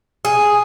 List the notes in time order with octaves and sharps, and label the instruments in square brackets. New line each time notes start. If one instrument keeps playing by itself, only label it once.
[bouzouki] G#4